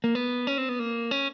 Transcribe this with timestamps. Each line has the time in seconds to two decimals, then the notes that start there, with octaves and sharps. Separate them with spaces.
0.04 A#3
0.15 B3
0.47 C#4
0.58 C4
0.69 B3
0.79 A#3
1.11 C#4